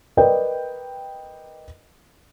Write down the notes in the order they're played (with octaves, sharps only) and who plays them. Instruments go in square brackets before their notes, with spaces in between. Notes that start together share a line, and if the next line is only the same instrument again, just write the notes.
[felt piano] A#4 B4 D5 D#5 G5